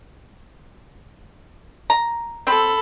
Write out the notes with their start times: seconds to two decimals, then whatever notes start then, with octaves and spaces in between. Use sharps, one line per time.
1.90 A#5
2.47 C4 A4 B5